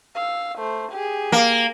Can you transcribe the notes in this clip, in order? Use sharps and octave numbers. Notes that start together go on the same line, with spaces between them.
F5 E6
A3 C5
G4 G#4
A#3